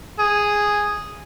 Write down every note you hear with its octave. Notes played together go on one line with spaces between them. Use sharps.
G#4